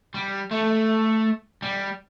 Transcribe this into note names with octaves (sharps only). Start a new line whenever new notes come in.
G3
A3
G3